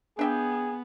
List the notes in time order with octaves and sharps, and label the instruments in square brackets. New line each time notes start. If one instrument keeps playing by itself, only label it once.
[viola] B3 [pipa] D4 E5 G5 [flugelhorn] G#4